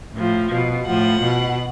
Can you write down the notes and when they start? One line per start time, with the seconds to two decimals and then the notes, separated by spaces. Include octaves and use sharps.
0.15 A2 F3
0.51 B2
0.85 A2 F3 F#5
1.21 B2